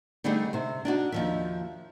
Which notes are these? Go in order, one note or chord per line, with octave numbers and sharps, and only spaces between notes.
D3 G3 A3 C4 D#4 G#4
C3 C5
D4 D#4 F#4
D#2 F3 E5